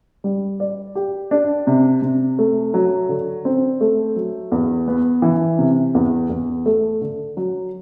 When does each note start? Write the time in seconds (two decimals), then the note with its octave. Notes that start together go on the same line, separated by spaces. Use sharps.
0.24 G3
0.60 D5
0.95 G4
1.31 D4
1.67 C3
2.02 C3
2.39 A3
2.74 F#3
3.09 D3
3.45 C4
3.81 A3
4.16 F#3
4.52 E2
4.88 B3
5.22 E3
5.58 C3
5.95 E2
6.30 E2
6.66 A3
7.01 D3
7.37 F#3